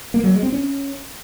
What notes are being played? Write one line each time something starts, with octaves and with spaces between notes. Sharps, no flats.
A#3
F#3
G#3
C4
C#4